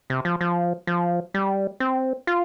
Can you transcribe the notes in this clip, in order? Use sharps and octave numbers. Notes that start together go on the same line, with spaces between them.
C3
F3
F3
F3
G3
C4
F4